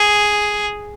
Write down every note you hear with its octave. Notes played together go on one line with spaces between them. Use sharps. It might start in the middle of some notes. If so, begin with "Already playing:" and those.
Already playing: G#4